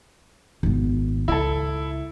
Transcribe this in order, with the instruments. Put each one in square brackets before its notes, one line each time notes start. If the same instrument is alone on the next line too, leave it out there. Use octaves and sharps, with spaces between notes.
[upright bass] G#1 B3
[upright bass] C#2 [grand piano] E4 A4